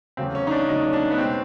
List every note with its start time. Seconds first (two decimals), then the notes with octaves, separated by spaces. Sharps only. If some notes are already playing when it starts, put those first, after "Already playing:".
0.17 E2 C#3 F#3 A3 C4
0.35 C#4
0.47 D#4
0.51 D4
0.68 E2 C#3 F#3 A3 D#4
0.85 C#4
0.93 D4
1.11 B3
1.18 B2 G#3 C4